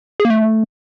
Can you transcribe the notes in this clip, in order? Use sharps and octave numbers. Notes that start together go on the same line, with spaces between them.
G#4
A#3
A3